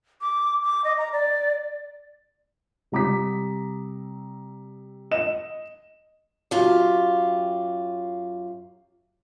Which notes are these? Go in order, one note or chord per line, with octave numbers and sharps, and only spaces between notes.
D6
D6
D#5
A#5
D5
C3 G3 A#5 D6 D#6 B6
D#5 E7
F#2 F4 G4